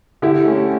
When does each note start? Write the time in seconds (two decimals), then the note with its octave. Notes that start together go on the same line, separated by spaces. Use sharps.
0.22 D3 E4 G4
0.45 A3 C#4